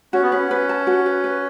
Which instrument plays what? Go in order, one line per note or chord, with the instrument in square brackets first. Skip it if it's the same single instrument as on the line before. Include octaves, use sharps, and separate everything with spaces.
[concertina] C#4 [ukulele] F#4
[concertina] B3
[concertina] C#4 [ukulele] B4
[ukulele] B4
A5
F#4
B4
B4